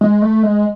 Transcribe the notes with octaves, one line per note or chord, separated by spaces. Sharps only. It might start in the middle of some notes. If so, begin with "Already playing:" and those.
G#3
A3
G#3